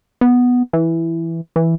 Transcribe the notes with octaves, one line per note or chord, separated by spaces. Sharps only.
B3
E3
E3